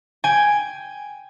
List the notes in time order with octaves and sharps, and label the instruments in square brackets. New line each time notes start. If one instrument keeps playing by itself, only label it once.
[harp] G5 G#5